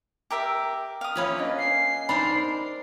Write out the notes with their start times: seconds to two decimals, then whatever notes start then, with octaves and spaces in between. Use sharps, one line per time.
0.31 G4 A#4 E5
1.01 F5 D#6
1.16 A#3 C#4 F4 B4 E5 B5
1.37 D4 D5 D#5
1.58 D#5 G#5 C7
2.09 D4 D#4 A#4 C5 D#5 B5